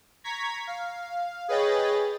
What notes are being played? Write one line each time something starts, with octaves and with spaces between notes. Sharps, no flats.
A#5 C#6 G#6 B6
F5
G#4 B4 C#5 D#5 G5 A6